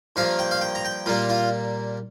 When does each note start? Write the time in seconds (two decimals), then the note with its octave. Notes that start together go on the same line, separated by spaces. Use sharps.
0.16 G2 F3 A#3 F5
0.39 G5
0.51 F5
0.61 G5
0.75 A#5
0.85 G5
1.06 A#2 G3 A#3 F4
1.29 F4